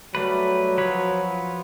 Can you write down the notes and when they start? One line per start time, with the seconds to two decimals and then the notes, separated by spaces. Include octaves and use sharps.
0.15 F#3 G3 A3 B4
0.78 F3 B4 C#5